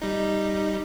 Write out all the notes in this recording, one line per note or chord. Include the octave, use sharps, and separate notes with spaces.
G3 D#4